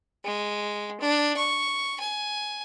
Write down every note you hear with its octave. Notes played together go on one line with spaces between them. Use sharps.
G#3
D4
C#6
G#5